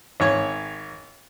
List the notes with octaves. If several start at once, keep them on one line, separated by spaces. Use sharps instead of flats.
G#1 C#5